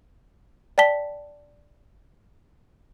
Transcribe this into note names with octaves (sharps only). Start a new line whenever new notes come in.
D5 G5 A5 B6 G7